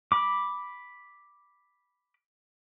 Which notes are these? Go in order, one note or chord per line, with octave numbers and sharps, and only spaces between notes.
B5 D6